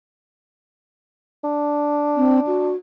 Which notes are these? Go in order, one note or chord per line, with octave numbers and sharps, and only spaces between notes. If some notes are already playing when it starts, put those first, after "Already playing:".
D4
C4
F#4